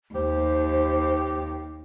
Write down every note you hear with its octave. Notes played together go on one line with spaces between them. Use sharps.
D#2 G4 C5